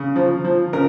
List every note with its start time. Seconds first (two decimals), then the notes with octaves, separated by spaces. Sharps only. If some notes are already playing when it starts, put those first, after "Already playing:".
Already playing: C#3
0.16 F3
0.45 F3
0.73 C#3 A#4